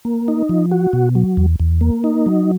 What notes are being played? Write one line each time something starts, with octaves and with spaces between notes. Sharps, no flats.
A#3
D#4
F3
F#4
B2
F#3
E2
E2
A#3
D#4
F#3